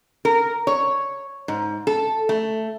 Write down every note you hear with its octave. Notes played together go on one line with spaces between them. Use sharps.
A#4
C#5
G#2
A4
A3